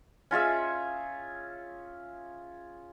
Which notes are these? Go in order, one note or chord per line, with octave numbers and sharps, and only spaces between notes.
C#4 F4 G#4 E5